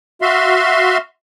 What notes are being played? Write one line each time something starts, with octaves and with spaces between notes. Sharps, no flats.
F#4 E5 F5 C6